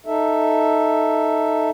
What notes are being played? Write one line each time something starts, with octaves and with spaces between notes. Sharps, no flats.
D#4 A4 E5